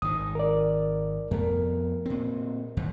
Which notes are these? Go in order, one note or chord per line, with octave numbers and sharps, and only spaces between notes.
G#1 D#3 D#6
A#4 D5
F2 A3 B3 A#4
A#2 C4
A1 E2 D#3